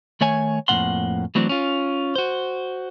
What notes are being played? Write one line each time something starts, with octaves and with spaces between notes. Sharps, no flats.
D#3 A3 C#5 G#5
F2 A2 C3 A#3 F#5 C6
E3 F#3 A3 C4 D4
C#4 F4
F#4 C5